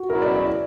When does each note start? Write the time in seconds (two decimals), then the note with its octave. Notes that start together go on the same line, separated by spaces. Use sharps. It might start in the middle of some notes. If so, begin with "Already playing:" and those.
Already playing: F#4
0.09 B2 F#3 C#4 E4 A#4
0.22 D5
0.35 D5